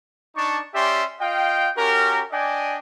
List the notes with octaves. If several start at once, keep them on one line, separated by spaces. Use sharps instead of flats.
D4 D#4 D5 A5 C#6
C#4 G4 D5 E5 G5 C6
F4 D#5 F5 G5
C#4 F#4 G4 A#4
D4 D5 D#5 G5 G#5